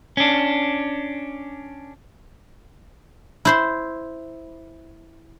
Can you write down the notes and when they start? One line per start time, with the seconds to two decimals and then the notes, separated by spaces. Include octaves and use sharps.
0.17 C#4 D4
3.45 E4 C5 C6